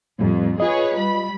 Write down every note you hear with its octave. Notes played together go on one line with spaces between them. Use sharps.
F2 A2 G3
F4 G#4 B4 C#5 D#5
G3 B5